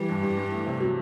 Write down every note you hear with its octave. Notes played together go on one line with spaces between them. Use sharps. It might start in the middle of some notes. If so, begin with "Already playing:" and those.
Already playing: E3 G3
G2
G2
G2
A2
C3
F#3